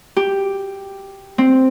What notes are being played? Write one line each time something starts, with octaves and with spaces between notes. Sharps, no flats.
G4
C4